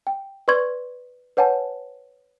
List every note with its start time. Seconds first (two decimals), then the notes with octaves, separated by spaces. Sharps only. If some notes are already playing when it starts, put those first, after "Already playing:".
0.07 G5
0.48 B4 D5 C6 C#6 G#6
1.37 B4 C#5 F#5 G#5 A5